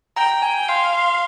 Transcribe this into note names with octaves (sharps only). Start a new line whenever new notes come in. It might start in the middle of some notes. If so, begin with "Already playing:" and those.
G5 A#5
G#5
F5 C6
C6